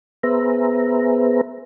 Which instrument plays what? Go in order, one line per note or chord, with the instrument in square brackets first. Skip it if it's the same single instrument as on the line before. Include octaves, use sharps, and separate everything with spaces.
[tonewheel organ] B3 G#4 B4 C5 E5 A#5